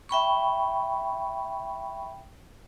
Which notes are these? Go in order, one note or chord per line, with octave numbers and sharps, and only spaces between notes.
E5 G5 B5 C#6